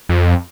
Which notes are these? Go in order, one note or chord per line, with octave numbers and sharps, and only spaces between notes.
F2